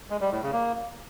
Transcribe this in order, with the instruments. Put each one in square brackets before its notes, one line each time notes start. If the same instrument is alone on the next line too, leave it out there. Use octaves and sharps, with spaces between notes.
[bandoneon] G#3
G3
A2
C#3
A#3